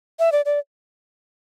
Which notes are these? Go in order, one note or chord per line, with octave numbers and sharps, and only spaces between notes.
E5
D5
D5